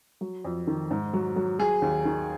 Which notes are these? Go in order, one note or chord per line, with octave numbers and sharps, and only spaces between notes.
F#3
F2
D#3
G#2
F#3
F#3
F#3 G#4
D#2
D#3